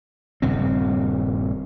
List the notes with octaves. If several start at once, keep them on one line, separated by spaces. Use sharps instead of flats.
D#1 G2 C#3 C4